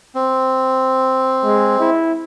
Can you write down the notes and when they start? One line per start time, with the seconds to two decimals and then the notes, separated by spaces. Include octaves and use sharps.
0.15 C4
1.44 G#3
1.80 E4